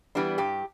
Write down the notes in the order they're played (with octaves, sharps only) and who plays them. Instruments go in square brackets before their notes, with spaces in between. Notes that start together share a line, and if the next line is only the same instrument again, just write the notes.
[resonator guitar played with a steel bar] E3 G3 B3 D4
G2 G4